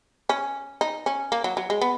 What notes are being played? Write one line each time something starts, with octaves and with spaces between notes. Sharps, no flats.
C#4
D#4
C#4
A#3
F#3
F#3
G#3
B3